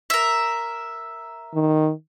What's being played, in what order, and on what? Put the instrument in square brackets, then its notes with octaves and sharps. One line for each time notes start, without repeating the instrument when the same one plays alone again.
[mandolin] A#4 E5
[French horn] D#3